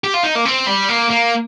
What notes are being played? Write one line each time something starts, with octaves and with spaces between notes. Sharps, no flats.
G4
F4
D#4
A#3
C4
G3
A#3
A#3